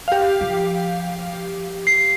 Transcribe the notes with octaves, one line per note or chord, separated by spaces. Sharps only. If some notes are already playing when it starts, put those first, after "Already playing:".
G4 F5
F3
C7